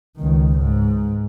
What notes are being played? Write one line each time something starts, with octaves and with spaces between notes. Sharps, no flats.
C#2 D#3
G#2